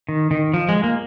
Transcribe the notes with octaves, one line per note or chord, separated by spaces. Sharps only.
D#3
D#3
F3
G#3
A#3